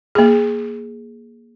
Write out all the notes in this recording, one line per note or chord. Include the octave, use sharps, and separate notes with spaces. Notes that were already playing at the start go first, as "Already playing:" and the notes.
A#3 G#4